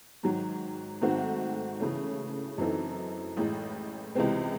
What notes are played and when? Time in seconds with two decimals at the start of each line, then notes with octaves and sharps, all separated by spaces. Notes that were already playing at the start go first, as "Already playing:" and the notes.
0.23 G#2 D#3 F#3
1.01 G#2 D#3 A3 C4 F#4
1.80 C#3 E3 A3 C#4
2.58 F#2 E3 C4 D#4 A4
3.37 A1 A2 G#3
4.15 C#2 C3 E3 G#3 C4